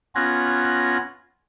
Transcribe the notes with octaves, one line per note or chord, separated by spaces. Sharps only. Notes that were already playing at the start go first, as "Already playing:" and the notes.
B3 C#4 F4 F#6 G#6 A#6